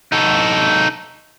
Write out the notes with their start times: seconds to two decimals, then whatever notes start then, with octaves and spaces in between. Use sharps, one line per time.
0.12 D#4 A4